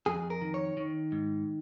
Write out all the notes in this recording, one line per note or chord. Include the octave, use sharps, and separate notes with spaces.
F2 G#4
A#4
D#3
C#5
D#3
G#2